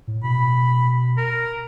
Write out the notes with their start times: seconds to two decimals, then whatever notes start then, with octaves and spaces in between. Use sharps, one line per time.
0.08 A2
0.24 B2 B5
1.17 A#4